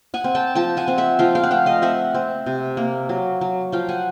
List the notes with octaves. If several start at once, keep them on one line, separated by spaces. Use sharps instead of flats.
F#5 G#5
C4
G5 A5
F3 G5 A5
F#5 G#5
C4
E5 F#5
F3 F5 G5
F5 G5
F#5
A3 F5 G5
D#5 F5
C4 E5 F#5
C4
C3
A#3
F#3
F#3
F3 F5 G5
F#5 G#5